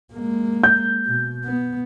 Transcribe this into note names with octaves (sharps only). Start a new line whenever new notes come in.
G#3 A#3
G6
B2
B3